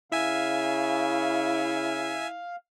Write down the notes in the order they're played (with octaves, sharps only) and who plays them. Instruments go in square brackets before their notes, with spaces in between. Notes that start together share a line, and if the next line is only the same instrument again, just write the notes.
[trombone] C#3 [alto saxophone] E4 [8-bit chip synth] E5 G#5 [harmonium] F5